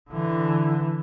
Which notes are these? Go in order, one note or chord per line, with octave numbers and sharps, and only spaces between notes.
D3 E3